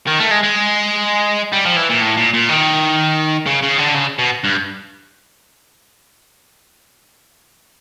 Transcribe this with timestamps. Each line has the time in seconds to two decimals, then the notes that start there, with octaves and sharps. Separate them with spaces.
0.07 D#3
0.19 A3
0.31 G#3
0.43 G#3
1.52 G3
1.65 F3
1.76 E3
1.89 A#2
2.01 A2
2.17 A#2
2.34 A#2
2.49 D#3
3.46 C#3
3.63 C#3
3.78 D3
3.95 C#3
4.19 B2
4.44 G2